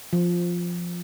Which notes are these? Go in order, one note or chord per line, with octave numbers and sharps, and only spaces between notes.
F3